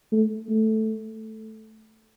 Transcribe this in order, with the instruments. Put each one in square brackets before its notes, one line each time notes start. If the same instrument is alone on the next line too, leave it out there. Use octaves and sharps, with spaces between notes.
[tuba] A3
A3